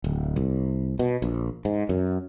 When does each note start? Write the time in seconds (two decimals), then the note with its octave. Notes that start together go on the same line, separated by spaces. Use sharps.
0.04 D1
0.36 C2
0.99 B2
1.22 A#1
1.65 G#2
1.89 F#2